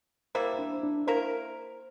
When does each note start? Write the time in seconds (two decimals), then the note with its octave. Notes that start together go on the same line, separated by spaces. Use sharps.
0.35 G3 A#3 E4 C5
0.59 D4
0.83 D4
1.07 A#3 E4 A#4 C5